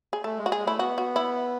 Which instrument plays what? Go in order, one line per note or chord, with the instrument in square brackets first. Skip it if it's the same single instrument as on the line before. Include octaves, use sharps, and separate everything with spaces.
[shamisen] G#4
[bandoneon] A3 [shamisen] A4
[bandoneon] G#3
[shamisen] F#4
G#4
[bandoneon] G#3
[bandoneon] A3 [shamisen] E4
[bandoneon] B3 [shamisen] F#4
[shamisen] F#4
E4